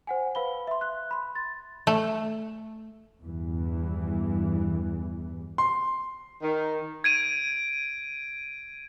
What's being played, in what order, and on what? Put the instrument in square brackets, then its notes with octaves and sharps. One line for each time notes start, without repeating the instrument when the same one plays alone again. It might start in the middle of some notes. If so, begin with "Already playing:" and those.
[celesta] C5 F#5 G#5
B4 F5 B5 G7
E5 C6
C6 F#6
B5 C6
A6
[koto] A3
[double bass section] E2 G2 E3
[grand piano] C6
[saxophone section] D#3
[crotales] G#6 D7 D#7